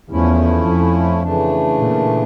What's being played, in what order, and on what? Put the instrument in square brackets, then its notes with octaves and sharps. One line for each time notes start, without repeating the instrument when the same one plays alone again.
[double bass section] E2 [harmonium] F3 A3 C#4 E4
[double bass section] F2
[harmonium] C#3 E3 A3 D4
[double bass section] A#2